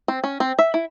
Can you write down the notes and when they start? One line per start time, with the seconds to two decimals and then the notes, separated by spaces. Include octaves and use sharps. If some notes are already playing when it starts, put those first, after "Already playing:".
0.08 C4
0.24 C#4
0.40 C4
0.59 E5
0.74 E4